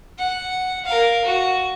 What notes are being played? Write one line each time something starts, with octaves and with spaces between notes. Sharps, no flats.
F#5
A#4 F5
F#4